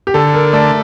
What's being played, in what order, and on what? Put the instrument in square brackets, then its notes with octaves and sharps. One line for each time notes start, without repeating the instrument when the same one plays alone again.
[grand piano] G4
[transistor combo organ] D3 [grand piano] A4
[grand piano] A#4
[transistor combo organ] A3 [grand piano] D5